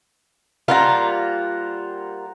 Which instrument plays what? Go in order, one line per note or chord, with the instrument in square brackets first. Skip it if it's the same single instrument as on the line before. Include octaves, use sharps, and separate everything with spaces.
[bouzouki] G3 A#3 F4 [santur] C5 F#5 A#5